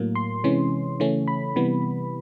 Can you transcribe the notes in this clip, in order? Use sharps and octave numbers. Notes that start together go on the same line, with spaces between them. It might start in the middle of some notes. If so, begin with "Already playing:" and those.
Already playing: A2 F#3 A#3
C6
C3 E3 G#3 C#4
C#3 E3 A3 C#4
B5
C3 E3 G3 B3